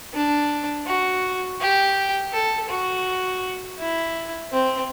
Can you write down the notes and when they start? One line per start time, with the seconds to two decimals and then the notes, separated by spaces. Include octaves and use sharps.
0.14 D4
0.86 F#4
1.60 G4
2.33 A4
2.69 F#4
3.79 E4
4.52 C4